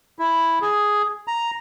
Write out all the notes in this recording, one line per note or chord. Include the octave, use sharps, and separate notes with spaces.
E4
G#4
A#5